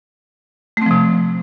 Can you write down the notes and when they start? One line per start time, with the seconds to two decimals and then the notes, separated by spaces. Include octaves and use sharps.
0.77 A3
0.82 C4
0.86 F3
0.91 C3